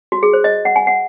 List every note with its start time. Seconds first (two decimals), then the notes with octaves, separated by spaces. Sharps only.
0.12 F#4
0.23 G#4
0.33 C5
0.44 D#5
0.65 F#5
0.76 G#5
0.87 F#5